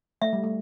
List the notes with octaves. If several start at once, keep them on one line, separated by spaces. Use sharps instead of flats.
A3 E5
G3
A3